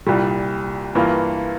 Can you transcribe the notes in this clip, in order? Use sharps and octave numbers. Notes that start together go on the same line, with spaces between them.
C2 A#2 G3
G2 E3 A#3 F4